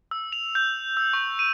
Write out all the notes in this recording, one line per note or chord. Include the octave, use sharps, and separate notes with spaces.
E6
F7
G6
E6
C#6
D#7